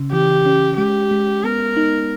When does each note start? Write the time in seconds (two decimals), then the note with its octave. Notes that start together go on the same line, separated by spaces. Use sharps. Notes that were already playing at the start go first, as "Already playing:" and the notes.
Already playing: C#3 C#4
0.13 E3 G4
0.46 C#4
0.78 G#3 G4
1.11 G#3
1.44 B3 A#4
1.77 D#4